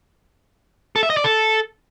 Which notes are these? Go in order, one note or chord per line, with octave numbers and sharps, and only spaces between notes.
A4
E5
D#5
D5
A4